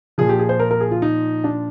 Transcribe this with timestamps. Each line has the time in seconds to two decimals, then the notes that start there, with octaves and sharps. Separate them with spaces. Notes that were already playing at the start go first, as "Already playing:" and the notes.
0.18 A#2 F3 G#4
0.29 G4
0.39 G#4
0.49 C5
0.60 A#4
0.71 A#4
0.81 G#4
0.91 F4
1.02 D#4
1.44 D4